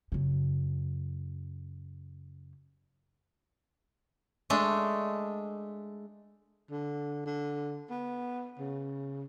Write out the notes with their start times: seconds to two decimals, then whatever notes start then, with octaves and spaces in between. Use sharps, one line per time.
0.12 F#2 C#3
4.50 G#3 A3 D4
6.71 D3
7.26 D3
7.90 B3
8.59 C#3